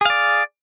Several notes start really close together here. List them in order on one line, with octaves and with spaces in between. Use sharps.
G#4 F5 D5